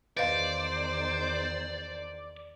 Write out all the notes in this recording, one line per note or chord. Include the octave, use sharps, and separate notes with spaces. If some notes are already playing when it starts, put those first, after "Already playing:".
E2 D#3 B4 C5 D5 D#5 F5